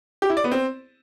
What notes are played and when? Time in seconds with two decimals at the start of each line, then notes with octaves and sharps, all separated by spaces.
0.22 G4
0.29 E4
0.37 D5
0.44 B3
0.52 C4